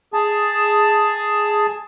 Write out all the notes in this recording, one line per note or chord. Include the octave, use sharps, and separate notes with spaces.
G#4 A5